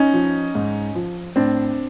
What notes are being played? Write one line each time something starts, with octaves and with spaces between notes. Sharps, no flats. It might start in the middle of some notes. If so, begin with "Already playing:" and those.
Already playing: C#4 D#4
F3
G#2
F3
A2 C4 D4